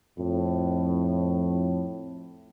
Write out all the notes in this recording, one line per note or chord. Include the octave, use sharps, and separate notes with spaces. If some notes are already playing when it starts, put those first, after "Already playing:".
F2 A2